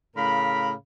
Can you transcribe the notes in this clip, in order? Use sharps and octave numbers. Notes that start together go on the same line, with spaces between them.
A2 C#3 A#4 F5 B5